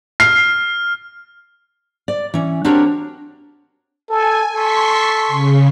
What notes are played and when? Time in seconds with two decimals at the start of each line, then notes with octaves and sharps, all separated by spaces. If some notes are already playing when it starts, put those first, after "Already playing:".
0.20 F6 C7
2.08 D5
2.34 E3 C#4
2.65 C4 D4 F#4 G4 A#4 C#5
4.09 A4 G#5
4.52 A4 C6 C#6 B6
5.28 C#3